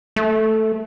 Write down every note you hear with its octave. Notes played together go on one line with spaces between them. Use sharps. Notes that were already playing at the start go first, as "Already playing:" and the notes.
A3